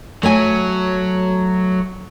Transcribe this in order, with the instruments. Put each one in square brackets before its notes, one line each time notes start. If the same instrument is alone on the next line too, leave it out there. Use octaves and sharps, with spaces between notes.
[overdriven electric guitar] F#3 [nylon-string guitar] A3 C#5 G#5